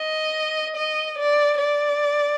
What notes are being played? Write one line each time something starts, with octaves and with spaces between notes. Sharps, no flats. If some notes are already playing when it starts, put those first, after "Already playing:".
Already playing: D#5
D#5
D5
D5